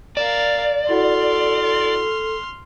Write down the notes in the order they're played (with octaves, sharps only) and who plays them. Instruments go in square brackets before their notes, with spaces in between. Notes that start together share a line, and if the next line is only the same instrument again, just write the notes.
[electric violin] A#4 F5 [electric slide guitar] D5 [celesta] E7
[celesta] E4 F#4 F#5 [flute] A4 [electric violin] C6 F6